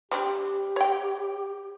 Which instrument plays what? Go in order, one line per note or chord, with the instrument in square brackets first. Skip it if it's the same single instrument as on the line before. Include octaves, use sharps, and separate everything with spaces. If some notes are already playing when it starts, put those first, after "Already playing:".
[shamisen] G3 C4 D4 [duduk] G4
[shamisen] C#5 G5